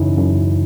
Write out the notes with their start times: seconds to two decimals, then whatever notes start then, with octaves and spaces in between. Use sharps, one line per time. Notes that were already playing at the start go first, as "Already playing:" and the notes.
Already playing: F#2 C#3 E3 C#4 D#4 E4
0.17 F#2